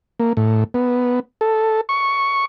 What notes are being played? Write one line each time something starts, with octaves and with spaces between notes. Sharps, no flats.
A#3
A2
B3
A4
C#6